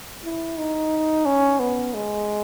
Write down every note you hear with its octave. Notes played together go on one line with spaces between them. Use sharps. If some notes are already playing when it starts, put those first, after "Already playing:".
E4
D#4
C#4
B3
G#3